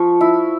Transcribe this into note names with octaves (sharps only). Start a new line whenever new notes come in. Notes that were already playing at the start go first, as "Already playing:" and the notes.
Already playing: F3 C#6
E4